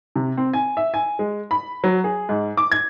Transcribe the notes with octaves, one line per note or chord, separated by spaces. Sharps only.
C3
C4
G#5
E5
G#5
G#3
B5
F#3
G#4
G#2
D6
G#6